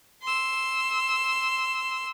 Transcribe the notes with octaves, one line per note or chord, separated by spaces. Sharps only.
C6 E6